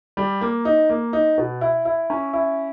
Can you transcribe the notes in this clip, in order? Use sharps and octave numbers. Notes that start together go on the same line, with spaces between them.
G3
A#3
D#4
A#3
D#4
B2
E4
E4
C#4
E4